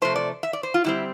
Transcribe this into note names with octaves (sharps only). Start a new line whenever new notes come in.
C3 F3 A3 C5
D5
E5
D5
C5
F4
D3 G3 C4 E4